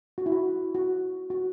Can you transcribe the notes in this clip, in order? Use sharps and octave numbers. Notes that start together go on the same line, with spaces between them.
F#4
E4
F#4
F#4
F#4